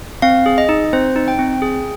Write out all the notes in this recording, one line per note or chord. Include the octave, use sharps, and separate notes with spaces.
C4 F5
G#4
D#5
D#4
C4 C5
D#4
G5
C4
G#4